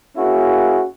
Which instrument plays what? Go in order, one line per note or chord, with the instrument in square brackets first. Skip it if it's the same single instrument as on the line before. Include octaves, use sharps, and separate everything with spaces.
[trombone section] A#3 C#4 E4 F#4 G#4